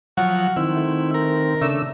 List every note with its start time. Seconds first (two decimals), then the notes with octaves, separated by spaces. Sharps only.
0.17 F3 F#3 F#4
0.56 D#3 C4 E4
0.76 A3
1.14 A#4
1.61 C#3 A3 D4 E6